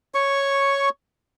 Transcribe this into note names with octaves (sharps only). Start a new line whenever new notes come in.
C#5 C#6